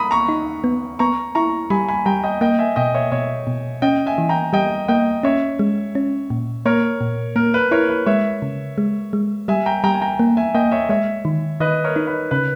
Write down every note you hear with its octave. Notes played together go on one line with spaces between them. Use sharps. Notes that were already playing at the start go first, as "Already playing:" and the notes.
Already playing: A#5 B5 D#6
A#5 C#6
D#4
B3
B3 A#5 C#6
E4 A#5 C#6
G3 G#5 B5
G#5 B5
G3 G5 A#5
D#5 G5
A#3 D#5 G5
E5 G#5
B2 D#5 G5
C#5 E5
B2 C#5 E5
B2
C#4 D#5 G5
E5 G#5
E3
G5 A#5
G3 D#5 G5
A#3 D#5 G5
C#4 C#5 E5
G#3
C#4
A#2
A#3 A#4 C#5
A#2
A#3 A#4
B4
E4 A#4 C#5
B4
G#3 C#5 E5
C#3
G#3
G#3
G3 E5 G#5
G5 A#5
G3 G5 A#5
G#5
G5 A#5
A#3
E5 G#5
A#3 D#5 G5
C#5 E5
G#3 C#5 E5
D#3
D#3 B4 D#5
A#4 C#5
D#4
B4
C#3 B4